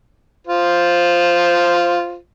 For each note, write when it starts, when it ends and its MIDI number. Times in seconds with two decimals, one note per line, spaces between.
0.47 2.17 65
0.47 2.17 72